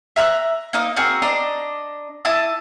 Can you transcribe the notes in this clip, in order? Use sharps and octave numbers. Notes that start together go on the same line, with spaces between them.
E5 A#5 F6 F#6
A#3 D#4 D#5
C4 F#4 G#4 A#4
D4 D#5 A#5
E4 A5 D#6